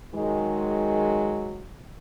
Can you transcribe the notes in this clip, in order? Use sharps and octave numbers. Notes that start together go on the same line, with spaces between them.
D#3 F#3 G#3